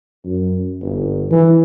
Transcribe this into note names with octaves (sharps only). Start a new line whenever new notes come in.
F#2
G1
E3